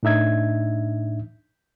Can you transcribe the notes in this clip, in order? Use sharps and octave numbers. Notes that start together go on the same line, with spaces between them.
A2 D4 D#4 E5 G#6